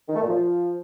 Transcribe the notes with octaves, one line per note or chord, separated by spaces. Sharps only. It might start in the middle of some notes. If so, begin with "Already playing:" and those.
D#3
A3
A#2
F3